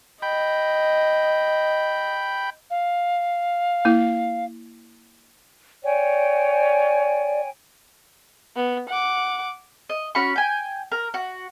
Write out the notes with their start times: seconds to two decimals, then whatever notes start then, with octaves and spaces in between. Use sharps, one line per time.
0.22 D#5 G5 B5
2.70 F5
3.85 A#3 E4
5.84 C#5 D5 G5 G#5
8.56 B3
8.89 F#5 D6
9.89 D#5
10.15 C#4 F#4 B5 C#6
10.36 G5 G#5
10.92 A#4
11.14 F#4